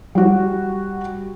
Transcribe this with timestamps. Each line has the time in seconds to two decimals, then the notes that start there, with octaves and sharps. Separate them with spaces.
0.15 G3 F#4